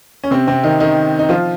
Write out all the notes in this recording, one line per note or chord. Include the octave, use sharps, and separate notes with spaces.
C#4
C3 C4
C3 C4
D#3 D#4
D#3 D#4
D#4
F3 F4